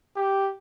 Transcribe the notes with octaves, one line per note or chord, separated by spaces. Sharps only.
G4